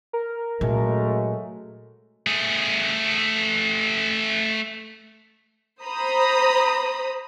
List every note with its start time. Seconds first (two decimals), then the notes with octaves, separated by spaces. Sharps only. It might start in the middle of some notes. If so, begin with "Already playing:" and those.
0.13 A#4
0.61 A#2 F#3 G#3 A3 C#4
2.27 A3 G#4
5.84 C5 A#5 B5 D#6